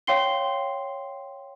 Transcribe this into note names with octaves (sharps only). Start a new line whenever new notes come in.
C#5 F5 G5 C6 C7 G7